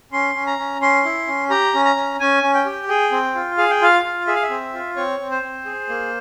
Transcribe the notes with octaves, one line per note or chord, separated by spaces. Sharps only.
C#4 C6
C#4
A#5
C#4
C#4 C6
E4
C#4
G4 A#5
C#4
A#5
C#4
C#4 G#5
C#4
G5
G4
G#4 G5
C4
F4
G#4 F5
G5
F4 F5
F4
G#4 E5
F5
E5
C4
F4
C4 C#5
C4
C5
C4
G#4
A#3